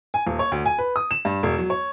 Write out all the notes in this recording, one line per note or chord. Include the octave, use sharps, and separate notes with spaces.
G#5
D#1
C#5
D2
G#5
B4
D#6
E7
G2
E1
F#3
C#5